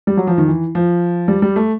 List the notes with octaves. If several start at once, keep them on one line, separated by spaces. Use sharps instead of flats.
G3
F#3
F3
D#3
E3
F3
G3
G3
A3